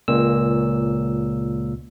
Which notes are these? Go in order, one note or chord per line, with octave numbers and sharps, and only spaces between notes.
C#2 A#2 E6